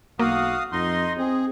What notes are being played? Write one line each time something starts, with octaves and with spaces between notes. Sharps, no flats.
B1 A#3 F#4 F5 D#6
F2 D#4 D#5 C6
C4 G#4